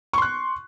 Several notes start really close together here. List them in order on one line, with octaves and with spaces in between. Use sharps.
C#6 C6 F#6